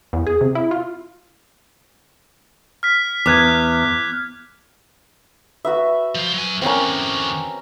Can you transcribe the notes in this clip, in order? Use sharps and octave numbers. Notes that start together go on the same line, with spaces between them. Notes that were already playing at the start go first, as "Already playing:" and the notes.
E2
G#4
C3
E4
F4
F6 B6
E2 D6 F#6 G#6
F#4 B4 E5
F3 C5
F#3 G#5
E2 D3 C4 C#4 A#4